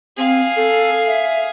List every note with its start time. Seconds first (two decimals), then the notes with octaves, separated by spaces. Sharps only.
0.18 C4 G#4 F5
0.56 A4
1.07 E5